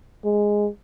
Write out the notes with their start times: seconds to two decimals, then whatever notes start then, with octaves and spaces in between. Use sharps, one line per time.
0.25 G#3